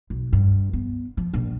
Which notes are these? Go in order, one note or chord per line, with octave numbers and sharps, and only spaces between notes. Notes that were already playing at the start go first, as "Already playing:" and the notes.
B1
G2
B3
F3
A#1